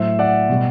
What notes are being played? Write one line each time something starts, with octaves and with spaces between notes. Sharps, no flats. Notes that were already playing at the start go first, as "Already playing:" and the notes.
Already playing: A2 F#3 C5 E5
D5 F#5
B2 G3